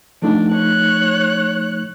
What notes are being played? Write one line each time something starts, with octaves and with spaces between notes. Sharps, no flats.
F3 A3 D4 D#4
C#5 F#6